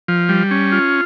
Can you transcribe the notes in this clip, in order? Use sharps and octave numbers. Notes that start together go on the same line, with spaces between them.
F3
G3
C#4
F4